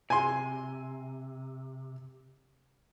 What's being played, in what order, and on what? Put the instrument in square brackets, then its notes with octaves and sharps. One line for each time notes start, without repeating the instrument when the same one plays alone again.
[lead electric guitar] C3 [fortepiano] G#5 C6